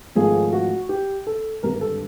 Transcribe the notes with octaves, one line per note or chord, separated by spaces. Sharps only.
G#1 G#2 F3 A3 G#4
F#4
G4
A4
G#1 G2 D3 G3 A#4
A#4
A4